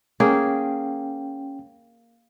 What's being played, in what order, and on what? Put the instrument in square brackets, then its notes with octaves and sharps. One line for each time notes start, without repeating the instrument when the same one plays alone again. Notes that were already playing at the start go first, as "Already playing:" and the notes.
[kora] A#3 G#4 [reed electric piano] C#4 G5